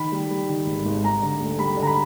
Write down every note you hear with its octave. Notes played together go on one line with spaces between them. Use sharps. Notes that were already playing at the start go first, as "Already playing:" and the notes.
Already playing: D#3 B5
G3
G3
D#3
G#1
G#1
G3 A#5
D3
D2
G3 B5
D3
A#5
B5